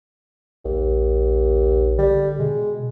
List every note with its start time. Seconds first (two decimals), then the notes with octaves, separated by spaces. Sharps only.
0.65 A#1 D#2
1.98 D3 G3
2.39 B2 G#3